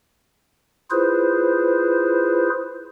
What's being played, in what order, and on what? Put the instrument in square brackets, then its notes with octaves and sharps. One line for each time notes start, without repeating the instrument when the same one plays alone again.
[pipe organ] E4 F4 G#4 B4 C5